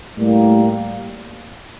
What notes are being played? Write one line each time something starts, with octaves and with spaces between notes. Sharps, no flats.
A2 G3 A#3